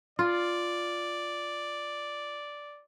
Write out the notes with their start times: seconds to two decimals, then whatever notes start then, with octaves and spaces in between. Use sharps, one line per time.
0.19 F4 D5